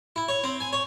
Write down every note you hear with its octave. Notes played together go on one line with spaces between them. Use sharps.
E4
C#5
C4
G#5
C#5